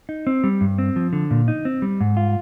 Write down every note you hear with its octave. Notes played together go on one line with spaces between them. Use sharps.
D#4
C4
G3
G2
C4
F3
D3
A#2
D#4
C4
G3
G#2
F4